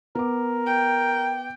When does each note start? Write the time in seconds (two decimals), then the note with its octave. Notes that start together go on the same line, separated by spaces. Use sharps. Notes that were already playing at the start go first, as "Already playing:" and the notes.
0.15 B3 A#4 D6
0.66 G5